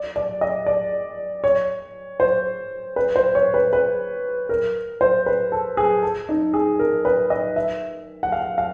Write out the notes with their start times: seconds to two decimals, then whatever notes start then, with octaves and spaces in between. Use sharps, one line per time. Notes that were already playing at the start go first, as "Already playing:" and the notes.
Already playing: D5
0.16 D5
0.41 D#5
0.66 D5
1.44 C#5
2.20 C5
2.96 B4
3.16 C5
3.35 C#5
3.54 B4
3.73 B4
4.49 A#4
5.01 C5
5.26 B4
5.52 A4
5.77 G#4
6.03 A4
6.29 D#4
6.54 G#4
6.79 A#4
7.05 B4
7.30 D#5
7.56 E5
8.23 F#5
8.32 F5
8.58 F5